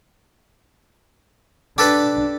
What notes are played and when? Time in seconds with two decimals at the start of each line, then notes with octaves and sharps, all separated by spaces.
1.78 D4 G4 A4 B4